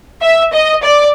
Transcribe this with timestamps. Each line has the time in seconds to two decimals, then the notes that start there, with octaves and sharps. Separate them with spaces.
0.22 E5
0.53 D#5
0.83 D5